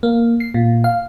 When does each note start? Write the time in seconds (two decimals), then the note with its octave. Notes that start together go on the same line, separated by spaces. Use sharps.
0.03 A#3
0.40 C7
0.54 A#2
0.84 F5